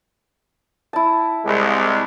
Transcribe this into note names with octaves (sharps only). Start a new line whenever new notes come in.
E4 A5
C2 G#3